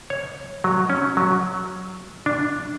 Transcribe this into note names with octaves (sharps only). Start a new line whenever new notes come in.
C#5
F#3
C#4
F#3
D4